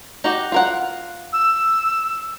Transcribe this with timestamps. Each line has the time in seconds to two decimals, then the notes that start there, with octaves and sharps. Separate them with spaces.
0.24 D#4 F#4 G4
0.52 F4 A#4 F#5
1.33 E6